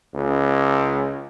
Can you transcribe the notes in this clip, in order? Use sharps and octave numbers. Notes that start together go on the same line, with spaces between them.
C#2